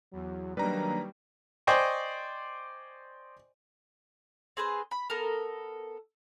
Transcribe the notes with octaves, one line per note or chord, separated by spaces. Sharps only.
E2 F#3
D#3 F#3 G3 A#3 D4 B4 A#5
C5 D5 D#5 G5 G#5 C#6
C4 G#4 B4 C5
B5
B3 A4 A#4